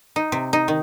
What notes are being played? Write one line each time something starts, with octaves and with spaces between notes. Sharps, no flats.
D#4
C3
D#4
D#3